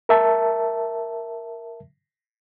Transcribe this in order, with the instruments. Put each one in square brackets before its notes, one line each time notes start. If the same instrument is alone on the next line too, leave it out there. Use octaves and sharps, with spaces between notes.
[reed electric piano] A#4 E5 A5